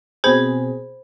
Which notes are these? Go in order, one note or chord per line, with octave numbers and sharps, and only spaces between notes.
B2 C4 G#4 C5 B5 G#6